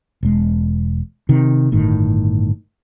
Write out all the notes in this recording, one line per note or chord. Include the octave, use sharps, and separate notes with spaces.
E1 G#3
C3 D#3
G1 A2 D#3